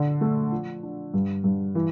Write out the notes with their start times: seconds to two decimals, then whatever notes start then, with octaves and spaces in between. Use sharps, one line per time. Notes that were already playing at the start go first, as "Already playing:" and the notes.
Already playing: D3
0.21 A3
0.51 F3
0.83 D4
1.14 G2
1.44 G2
1.75 E3